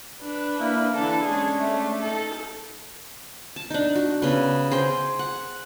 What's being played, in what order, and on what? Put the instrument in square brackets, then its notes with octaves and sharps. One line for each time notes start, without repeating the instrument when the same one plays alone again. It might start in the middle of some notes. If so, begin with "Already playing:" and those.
[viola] D4 B4
[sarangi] A#3 [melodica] E4
[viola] D3 E3 [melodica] D4 [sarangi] A4
[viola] G#3 C#4 [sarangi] G#4
[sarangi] A3
[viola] D#4 [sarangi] A4
[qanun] A5
D4 D#4
F#4
C#3 B3
G#4 C5 G5
F#5